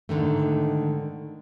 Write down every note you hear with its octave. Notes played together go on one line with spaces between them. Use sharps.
G#2 D3 D#3 A3